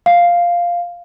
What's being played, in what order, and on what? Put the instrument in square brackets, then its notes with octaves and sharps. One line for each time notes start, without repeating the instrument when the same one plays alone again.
[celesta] F5